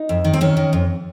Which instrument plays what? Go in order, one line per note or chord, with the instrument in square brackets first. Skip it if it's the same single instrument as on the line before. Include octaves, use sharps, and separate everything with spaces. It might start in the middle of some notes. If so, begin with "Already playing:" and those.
Already playing: [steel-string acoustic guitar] D#4
F2
D#3
C4
D#3 C#4
D#3
F2